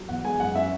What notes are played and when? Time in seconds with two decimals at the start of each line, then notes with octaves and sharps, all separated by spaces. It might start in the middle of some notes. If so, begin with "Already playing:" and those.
Already playing: F#3
0.09 E2 F#5
0.25 G#3 G#5
0.40 F#2 F#5
0.55 C#4 E5